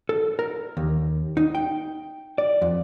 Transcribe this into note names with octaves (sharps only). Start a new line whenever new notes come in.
A4
A#4
D#2
D#4
G5
D5
F2